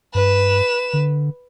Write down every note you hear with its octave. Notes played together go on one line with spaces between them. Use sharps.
G2 B4 E7
D3